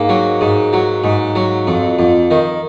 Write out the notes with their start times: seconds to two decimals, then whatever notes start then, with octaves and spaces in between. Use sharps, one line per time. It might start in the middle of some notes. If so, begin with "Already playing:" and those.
Already playing: G#2 A#3
0.09 F#3
0.41 G#2
0.73 F#3
1.04 G#2
1.35 F#3
1.67 F2
1.99 F2
2.31 D#3